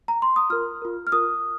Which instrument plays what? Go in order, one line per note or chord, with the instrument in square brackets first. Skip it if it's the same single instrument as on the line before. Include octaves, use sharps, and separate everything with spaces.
[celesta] A#5
C6
D#6
F4 A#4 F6
F4 A#4
F6
F4 A#4 D#6